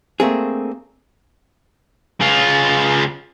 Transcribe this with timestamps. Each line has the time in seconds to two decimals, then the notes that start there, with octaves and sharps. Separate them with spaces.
0.20 A3 A#3 C4 D4 G#4
2.21 C#3 F4